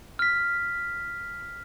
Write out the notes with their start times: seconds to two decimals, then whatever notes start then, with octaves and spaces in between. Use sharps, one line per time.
0.19 F6 B6